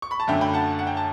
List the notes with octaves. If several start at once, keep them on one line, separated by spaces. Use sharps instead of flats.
C#6
B5
A5
F#2 D3 A3 E5 G5
G5 B5
F#5 A5
F#5
G5
A5